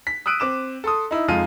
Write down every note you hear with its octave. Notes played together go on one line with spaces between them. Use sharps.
B6
D#6 E6 F#6 D7 D#7
C4 D6 E7
A4 C6 D#6
D#4 E4
F2 G#3 D#4 F4 D#7